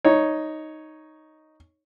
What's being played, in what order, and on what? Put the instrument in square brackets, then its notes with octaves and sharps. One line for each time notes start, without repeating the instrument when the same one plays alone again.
[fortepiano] D#4 C#5